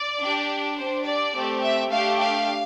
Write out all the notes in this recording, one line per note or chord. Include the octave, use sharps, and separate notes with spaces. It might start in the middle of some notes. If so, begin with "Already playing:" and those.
Already playing: D5
D4 G4
D4 G4 C5
D5
A3 C4 G4
E5
A3 D4 G4 F5
F5